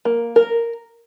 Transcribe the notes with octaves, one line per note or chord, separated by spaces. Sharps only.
A#3
A#4